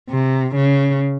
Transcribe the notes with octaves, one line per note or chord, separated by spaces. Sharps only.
C3
C#3